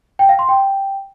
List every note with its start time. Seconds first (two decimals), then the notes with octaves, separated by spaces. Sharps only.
0.19 G5
0.29 F5
0.39 C6
0.49 G5